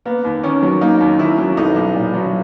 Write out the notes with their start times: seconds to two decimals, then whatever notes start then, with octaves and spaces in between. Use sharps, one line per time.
0.06 A#3 B3
0.24 D#2
0.43 D#3 C#4
0.63 F#3
0.81 A#3 D#4
1.00 D#2
1.19 D#3 E4
1.38 F#3
1.57 B1 D#4
1.76 B1
1.95 A#2
2.14 F#3